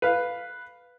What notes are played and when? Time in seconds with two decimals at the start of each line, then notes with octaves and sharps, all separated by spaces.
0.02 B4 F5